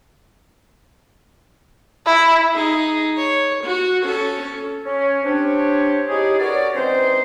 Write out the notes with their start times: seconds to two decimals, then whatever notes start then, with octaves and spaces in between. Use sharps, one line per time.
2.06 E4
2.54 D#4 G#4
3.18 C#5
3.64 F#4
4.03 C#4 A4
4.85 C#4
5.25 C4 D4 G4 C#5
6.09 C#4 D#4 E4 G4 G#4
6.39 C#4 F#4 A#4 B4 C#5 D5
6.75 E3 G#3 C4 C#4 D#4 C5